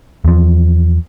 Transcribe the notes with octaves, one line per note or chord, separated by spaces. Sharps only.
E2 F3